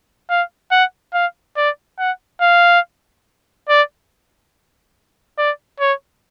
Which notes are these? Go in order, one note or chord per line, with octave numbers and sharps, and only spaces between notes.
F5
F#5
F5
D5
F#5
F5
D5
D5
C#5